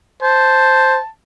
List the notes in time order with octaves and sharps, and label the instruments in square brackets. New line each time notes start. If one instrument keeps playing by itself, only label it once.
[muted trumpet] C5 [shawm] A5